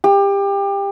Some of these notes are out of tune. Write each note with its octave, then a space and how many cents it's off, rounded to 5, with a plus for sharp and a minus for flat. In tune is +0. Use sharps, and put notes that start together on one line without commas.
G4 +25